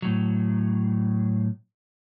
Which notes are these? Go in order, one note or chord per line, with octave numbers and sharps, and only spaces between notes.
A2 F#3